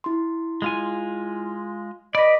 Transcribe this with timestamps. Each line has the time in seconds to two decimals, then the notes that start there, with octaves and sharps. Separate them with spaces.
0.04 E4 C6
0.62 G#3 F4 G#5
2.15 B4 D5 D#5 B5 D6 A#6